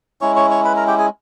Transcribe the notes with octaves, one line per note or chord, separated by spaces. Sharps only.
G#3 C#4 E4 C#5 C#6
C#5 C#6
C#5 C#6
B4 B5
A#4 A#5
G4 G5
G#4 G#5